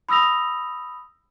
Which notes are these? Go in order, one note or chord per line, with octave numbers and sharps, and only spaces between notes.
B5 D#6 E6 A#6 F7